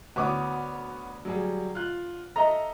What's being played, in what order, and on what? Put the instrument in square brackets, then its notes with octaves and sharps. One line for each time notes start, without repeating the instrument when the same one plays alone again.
[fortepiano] D2 D6 D#6 [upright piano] B3 F#4 C#5
[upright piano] F#3 G3 G#4
F4 F#6
[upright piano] A4 D#5 E5 [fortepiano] A#5